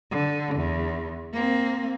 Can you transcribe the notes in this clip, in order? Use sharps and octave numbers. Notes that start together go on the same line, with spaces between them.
D3
E2
A#3 C4